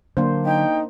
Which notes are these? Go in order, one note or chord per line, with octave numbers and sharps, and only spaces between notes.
D3 F#3 A#3 D4 C5
D#4 G5